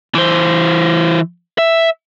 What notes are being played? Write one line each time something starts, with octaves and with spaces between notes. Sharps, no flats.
E3 C5
E5